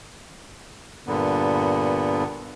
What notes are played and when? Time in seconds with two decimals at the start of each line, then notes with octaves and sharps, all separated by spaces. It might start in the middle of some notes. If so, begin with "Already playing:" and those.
1.07 G2 A#2 D3 B3